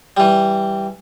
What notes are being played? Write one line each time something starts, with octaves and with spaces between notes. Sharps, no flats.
E3 G3